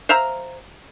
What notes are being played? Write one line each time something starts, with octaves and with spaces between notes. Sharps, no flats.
C5 E5 F5 A#5